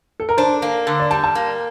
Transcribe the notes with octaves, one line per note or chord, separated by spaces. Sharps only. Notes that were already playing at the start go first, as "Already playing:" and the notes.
A4
A#4
D4 C5
A#3
D3
D5
G3 A5
A5
A#3